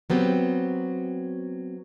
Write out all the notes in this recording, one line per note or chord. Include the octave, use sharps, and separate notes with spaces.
F#3 B3 C4 G4